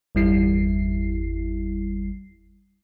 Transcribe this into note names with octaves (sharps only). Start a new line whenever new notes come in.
G1 E2 G3 E4 C7